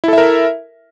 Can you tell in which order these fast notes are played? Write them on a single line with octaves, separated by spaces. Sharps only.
E4 A4 E5 A#4